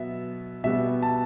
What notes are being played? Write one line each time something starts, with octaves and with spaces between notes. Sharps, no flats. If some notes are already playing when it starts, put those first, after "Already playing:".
Already playing: B2 F#3 B3 E5
B2 G3 B3 E5
A5